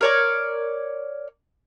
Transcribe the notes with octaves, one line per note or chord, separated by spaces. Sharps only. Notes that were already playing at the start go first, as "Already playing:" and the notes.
A#4 C#5 D5